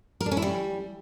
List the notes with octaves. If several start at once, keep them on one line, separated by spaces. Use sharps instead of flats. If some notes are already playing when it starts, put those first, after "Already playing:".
A#4
D4
C#4
E4
G3